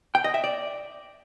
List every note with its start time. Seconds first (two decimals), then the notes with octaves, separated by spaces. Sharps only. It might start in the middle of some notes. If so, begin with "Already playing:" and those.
0.15 G5
0.24 D#5
0.34 E5
0.44 D5